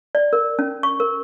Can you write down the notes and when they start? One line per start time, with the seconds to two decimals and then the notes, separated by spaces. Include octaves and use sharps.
0.15 D5
0.33 A#4
0.59 C#4
0.83 C#6
1.00 A#4